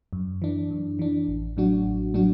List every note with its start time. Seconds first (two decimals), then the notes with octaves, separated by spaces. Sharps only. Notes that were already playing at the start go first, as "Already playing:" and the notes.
0.13 F#2
0.42 E3 D4
0.71 F#2
0.99 E3 D4
1.28 A1
1.57 A2 F#3 D4 F#4
1.86 A1
2.14 A2 F#3 D4 F#4